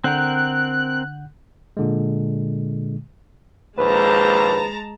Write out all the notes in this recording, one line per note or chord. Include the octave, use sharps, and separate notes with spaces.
D3 C4 A#4 F#5 F#6 G6
A#2 D3 G#3
A#1 D#2 G#3 B4 C5 A5 A#5